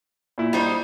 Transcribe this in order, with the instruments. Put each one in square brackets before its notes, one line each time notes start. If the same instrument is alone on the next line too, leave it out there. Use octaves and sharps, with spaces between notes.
[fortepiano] A#2 E4
[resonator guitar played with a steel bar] G3 D#4 C5